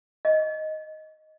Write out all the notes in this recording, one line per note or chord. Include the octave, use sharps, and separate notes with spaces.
D#5